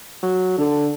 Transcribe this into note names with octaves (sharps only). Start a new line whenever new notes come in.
F#3
D3 A4